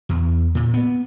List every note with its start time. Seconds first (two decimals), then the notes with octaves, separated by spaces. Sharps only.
0.09 E2
0.55 A#2
0.74 B3